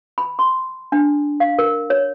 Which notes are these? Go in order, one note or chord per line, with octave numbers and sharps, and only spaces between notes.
B5
C6
D4
F5
A#4
C#5